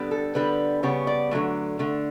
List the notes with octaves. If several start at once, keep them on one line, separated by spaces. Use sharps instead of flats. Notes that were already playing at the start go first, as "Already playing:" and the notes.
Already playing: D3 G3 B3
A4
D3 G3 B3 B4
C#3 G3 B3 C#5
D5
D3 F#3 A3
D3 A3